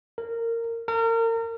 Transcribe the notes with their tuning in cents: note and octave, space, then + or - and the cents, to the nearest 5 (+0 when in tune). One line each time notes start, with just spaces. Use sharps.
A#4 -20
A#4 -35